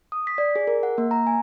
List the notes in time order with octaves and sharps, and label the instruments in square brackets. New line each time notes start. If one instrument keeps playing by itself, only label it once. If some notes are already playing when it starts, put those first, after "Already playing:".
[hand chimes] D#6
B6
D5
G#4
A#4
F#5
A#3
A#5
G#5